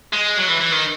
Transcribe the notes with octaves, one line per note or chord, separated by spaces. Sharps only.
G#3
F#3
E3
E3
D#3